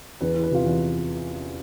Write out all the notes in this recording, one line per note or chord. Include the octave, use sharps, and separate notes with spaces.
E2 B4
E3
B4
C3 F4
E2